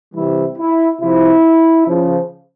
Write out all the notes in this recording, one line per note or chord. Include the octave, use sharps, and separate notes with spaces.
C3 E3 G3 E4
E4
C3 F3 E4
C#3 F3